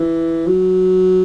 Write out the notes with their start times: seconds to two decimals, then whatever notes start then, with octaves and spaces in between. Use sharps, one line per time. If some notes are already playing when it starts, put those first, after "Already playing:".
Already playing: E3
0.47 F#3